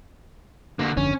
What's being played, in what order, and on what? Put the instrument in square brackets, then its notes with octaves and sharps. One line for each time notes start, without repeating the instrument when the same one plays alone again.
[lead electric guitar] D3 A#3
[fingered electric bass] G1 F2 D3 [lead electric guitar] C#4